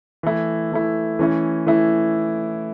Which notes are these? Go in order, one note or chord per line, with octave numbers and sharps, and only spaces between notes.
E3 A3 E4
E3 A3 E4
E3 A3 C#4 E4
E3 A3 C#4 E4